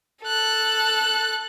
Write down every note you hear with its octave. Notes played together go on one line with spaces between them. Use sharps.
A4 F#6